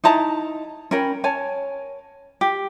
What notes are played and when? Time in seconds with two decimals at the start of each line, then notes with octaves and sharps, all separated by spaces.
0.04 D#4 E4 A5 A#5
0.91 C#4 A#4 G5 B5
1.24 C#5 G#5 A5
2.41 G4